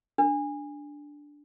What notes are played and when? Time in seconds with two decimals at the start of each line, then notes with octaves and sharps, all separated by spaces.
0.18 D4